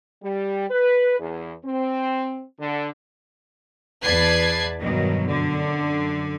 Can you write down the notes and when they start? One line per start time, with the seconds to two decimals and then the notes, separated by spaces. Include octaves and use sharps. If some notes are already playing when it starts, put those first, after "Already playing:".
0.24 G3
0.70 B4
1.19 E2
1.65 C4
2.60 D3
4.04 E2 B4 D5 A5 G#6 C7
4.79 G2 B2 D#3 F#3
5.27 F#2 D3